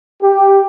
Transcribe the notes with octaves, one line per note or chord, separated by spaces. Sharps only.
G4